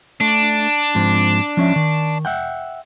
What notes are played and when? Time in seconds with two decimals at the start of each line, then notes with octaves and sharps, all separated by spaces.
0.21 A3 D4
0.95 G#2 F3 C4
1.57 F3 C#4 E5
1.76 D#3
2.25 E5 F#5 G5